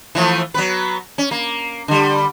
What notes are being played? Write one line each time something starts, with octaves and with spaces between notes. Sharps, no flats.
E3 F3 A3
F#3 B3 B4
C#4
A#3
D3 G3